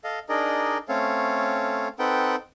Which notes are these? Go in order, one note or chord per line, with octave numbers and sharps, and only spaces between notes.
A4 D#5 F5
D4 D#4 G#4 A#4 D5 D#5
A3 C4 C#4 A4 C#5 F5
C4 D#4 A4 B4 F#5 G5